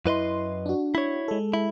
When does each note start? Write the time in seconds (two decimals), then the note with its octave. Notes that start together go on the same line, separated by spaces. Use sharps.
0.06 F#2 E4 B4 D#5 C6
0.66 D4 F#4
0.95 E4 C#5
1.28 G#3 A4
1.54 E4